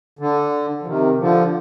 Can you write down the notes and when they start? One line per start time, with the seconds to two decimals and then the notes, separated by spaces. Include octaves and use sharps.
0.19 D3
0.82 F3
0.86 C3 D#3
1.19 D3 F3